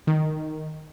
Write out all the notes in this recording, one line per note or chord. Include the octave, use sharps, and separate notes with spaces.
D#3